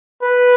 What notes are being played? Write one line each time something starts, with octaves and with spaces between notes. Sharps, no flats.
B4